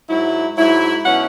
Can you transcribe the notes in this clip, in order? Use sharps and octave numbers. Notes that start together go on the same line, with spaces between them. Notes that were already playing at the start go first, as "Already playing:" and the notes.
G#2 F#3 E4
G#2 F#3 E4
B2 F#3 C#4 E4 F#5